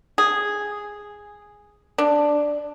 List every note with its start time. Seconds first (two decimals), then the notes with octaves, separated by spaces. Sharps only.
0.18 G#4
1.98 D4